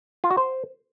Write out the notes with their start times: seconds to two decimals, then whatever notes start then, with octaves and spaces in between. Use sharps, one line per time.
0.24 F4
0.31 F#4
0.37 C5